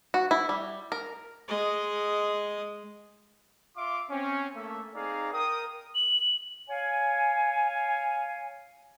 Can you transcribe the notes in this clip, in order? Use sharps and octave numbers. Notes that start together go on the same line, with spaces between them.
F#4
E4
G3
A#4
G#3 D#5
F4 E5 F5 C6 D6
C4 C#4
A3 A#3 E5
C4 D#4 G#4 D5 F5 A#5
A#4 G5 D#6
F#7
C#5 F5 G#5